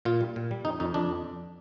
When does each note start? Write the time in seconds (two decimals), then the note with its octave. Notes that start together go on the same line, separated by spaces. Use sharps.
0.05 A#2 F4
0.21 G3
0.36 A#2
0.51 G3
0.65 F2 D#4
0.80 F2 D#4
0.94 F2 D4